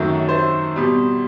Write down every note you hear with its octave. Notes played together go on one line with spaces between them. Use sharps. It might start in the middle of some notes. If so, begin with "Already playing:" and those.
Already playing: F#2 D#3 F#3 A3
C5
B2 G3